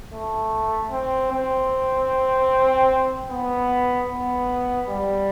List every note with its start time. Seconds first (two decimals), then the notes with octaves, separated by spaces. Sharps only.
0.12 A3
0.91 C4
1.31 C4
3.30 B3
4.10 B3
4.89 G3